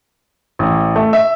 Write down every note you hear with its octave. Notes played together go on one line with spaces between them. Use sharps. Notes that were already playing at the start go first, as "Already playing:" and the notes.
A1
A3
E5